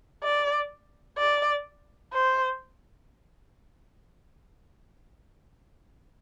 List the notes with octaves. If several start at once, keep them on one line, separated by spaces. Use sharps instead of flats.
D5
D5
C5